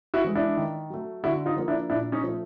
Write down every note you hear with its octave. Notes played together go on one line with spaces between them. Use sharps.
E4 F#4
E3 G#3
D4 E4
D#3
F#3 A3
D3 E4 F#4
D#4 F4
F3 A#3
D4 E4
A#2 D4 E4
C#4 D#4
F3 A3